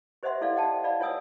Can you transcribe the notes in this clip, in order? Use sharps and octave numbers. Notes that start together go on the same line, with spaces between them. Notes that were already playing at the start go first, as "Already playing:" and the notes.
G4 C5 D#5 E5 F#5 C6
E4 A4 D5 F5
D#5 F#5 G5 A5
D5 D#5 F5 B5
F4 C#5 F#5 G#5 D#6 E6